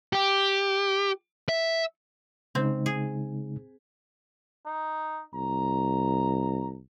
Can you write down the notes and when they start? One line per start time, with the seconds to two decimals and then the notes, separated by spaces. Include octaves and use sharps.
0.13 G4
1.49 E5
2.55 C#3 G#3 C4 D#4
2.86 G#4
4.66 D#4
5.35 C2 A#5